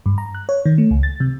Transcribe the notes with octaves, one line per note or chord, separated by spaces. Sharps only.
G2
A#5
F#6
C#5
D#3
A3
C#2
A6
C3